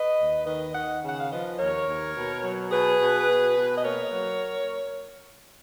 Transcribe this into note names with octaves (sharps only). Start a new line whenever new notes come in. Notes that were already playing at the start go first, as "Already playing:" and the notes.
Already playing: B4 D#5
D#2
D#3 B4 D#5
D#3 D#5 F#5
C#3
F#5
F5
F3 B4 D#5
D#2 A#4 C#5
D#2
B2
F#3
B2 G#4 B4
B2
B2
B2
D#5
A#3 A#4 C#5
F#3